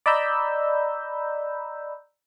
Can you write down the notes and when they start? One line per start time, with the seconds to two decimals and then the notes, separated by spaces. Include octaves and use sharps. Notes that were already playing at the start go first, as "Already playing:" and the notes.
0.06 D5 D#5 A#5 B5 E6 G6